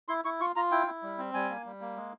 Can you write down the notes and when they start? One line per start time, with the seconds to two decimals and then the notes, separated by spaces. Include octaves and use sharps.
0.08 E4 C6
0.25 E4 C#6
0.40 F4 C#6
0.56 F4 A#5
0.71 E4 G5
0.87 E4
1.02 G3
1.18 C4
1.34 G3 G#5
1.49 A#3
1.66 G3
1.81 A#3
1.96 G#3